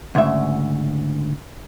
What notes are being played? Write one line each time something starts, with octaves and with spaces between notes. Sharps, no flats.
D2 G#2 C#3 E5